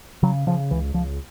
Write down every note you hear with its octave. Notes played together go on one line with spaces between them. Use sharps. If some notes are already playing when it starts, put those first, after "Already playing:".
C#3 F#3
C#3 F3
C#2 E3
C#2 F3